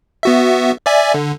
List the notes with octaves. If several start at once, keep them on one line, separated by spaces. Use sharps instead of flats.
B3 F#4 E5
D5 E5 G#5
D3